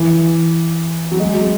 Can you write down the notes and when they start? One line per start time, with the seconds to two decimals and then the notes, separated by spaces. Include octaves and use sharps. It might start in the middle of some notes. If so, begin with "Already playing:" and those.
Already playing: E3
1.12 F#3
1.20 G#3
1.42 G#3